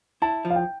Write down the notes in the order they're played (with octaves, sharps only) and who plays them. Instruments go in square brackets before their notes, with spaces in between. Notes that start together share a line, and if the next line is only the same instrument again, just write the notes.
[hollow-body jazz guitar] E4 [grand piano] A5
[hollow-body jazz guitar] F3
[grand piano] F5
G5